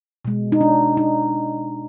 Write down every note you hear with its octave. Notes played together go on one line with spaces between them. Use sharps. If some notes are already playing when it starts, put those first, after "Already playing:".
B2 G#3
D#4
D4
D#4